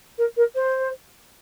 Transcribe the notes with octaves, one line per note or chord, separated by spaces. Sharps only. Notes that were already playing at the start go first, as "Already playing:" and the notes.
A#4
A#4
C5